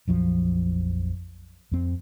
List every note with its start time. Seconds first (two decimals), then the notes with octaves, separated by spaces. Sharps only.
0.08 A#1 F2 F3 F#3
1.72 F2 C4